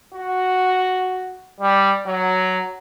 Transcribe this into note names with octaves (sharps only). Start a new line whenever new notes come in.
F#4
G3
F#3